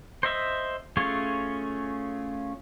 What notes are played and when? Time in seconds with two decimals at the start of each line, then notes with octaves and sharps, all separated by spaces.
0.23 C5 D#5 E5
0.97 A3 C#4 F4 G#4 C#5